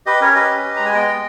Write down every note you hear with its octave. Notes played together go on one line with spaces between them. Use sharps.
G4 B4 D#5
C#4 A#4 C#5
G4 B4 D#5
C#4
G4
G#3 A#5
G#5
B3 D#5 G5
G#3